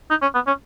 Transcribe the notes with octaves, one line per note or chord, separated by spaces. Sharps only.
D#4
C#4
B3
C#4